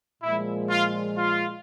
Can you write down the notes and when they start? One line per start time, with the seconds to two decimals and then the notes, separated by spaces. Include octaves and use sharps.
0.23 A#2 F3 G#3 E4
0.69 F4
1.17 F4